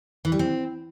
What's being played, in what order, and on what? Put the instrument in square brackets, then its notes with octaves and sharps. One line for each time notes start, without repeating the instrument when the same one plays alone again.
[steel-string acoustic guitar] E3
G3
C4